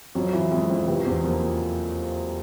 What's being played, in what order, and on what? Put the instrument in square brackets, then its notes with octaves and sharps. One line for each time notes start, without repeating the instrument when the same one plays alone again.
[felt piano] F2 [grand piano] F#3
[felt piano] E3
[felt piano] F2 [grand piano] G#3
[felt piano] F2
[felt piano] C3 [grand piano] B3
[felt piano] E2 [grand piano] C4
[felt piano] F3 [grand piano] A#3